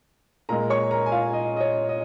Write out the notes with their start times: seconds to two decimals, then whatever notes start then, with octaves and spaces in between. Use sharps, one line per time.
0.49 A#2 G#3 A#4 A#5
0.70 C#5 C#6
0.91 A#4 A#5
1.06 G#5
1.12 F4 F5
1.33 D#5
1.56 D#5
1.61 C#5
1.89 D#5